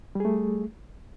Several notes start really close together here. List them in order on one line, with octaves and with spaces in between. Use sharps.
G3 G#4 A3